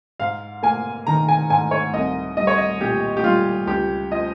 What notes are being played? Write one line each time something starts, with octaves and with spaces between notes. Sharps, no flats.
G#2 F5
A#3 G#5
D#3 A#5
G#5
G#2 G#5
C#5
C2 D#5
G3 D#5
C#5
D#5
A#2 G4
G4
G3 F4
C#2 G4
F3 D#5